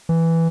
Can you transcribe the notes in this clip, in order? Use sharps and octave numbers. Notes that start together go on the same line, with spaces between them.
E3